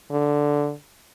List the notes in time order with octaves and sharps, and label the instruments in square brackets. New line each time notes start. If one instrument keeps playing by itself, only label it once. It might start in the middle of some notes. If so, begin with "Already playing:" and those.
[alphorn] D3